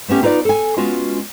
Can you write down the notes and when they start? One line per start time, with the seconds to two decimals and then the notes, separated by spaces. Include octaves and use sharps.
0.08 A3 B3 C#4 G4
0.23 D#4 F4 B4 C#5 D5
0.45 A4 G#5
0.77 G#3 B3 C#4 F4 F#4